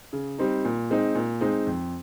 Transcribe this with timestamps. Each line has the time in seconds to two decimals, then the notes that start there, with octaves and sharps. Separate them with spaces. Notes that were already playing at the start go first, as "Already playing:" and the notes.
0.13 C#3
0.38 G3 C4 D#4
0.65 A#2
0.90 G#3 C4 D#4
1.15 A#2
1.41 G#3 C4 D#4
1.67 F2